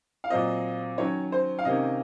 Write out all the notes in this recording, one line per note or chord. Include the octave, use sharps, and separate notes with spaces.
F5
A#2 F#3 C4 D#5
D#3 F#3 C#4 C#5
C5
F5
C3 D#3 A#3 C#4 D#5